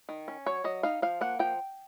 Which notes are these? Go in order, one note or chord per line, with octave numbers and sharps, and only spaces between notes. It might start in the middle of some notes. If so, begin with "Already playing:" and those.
D#3
C#4
F#3 C#5
F#3 D#5
D#4 F5
F3 F5
A#3 F#5
F3 G5